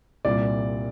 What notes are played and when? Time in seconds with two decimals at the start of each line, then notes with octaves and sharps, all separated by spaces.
0.25 C2 A#2 G3 D5